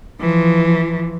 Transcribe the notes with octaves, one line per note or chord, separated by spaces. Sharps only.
E3 F3